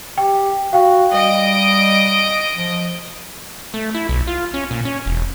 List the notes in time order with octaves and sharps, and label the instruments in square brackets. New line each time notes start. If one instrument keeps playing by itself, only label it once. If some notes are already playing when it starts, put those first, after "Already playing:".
[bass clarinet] G4 [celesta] G5
[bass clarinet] F#4 [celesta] F5 G5
[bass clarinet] G3 [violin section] D#5 D7
[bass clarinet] F3
[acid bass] A3
E4
B1
F4
C#4
A#2
C#4
E1